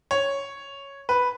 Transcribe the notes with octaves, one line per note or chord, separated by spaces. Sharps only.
C#5
B4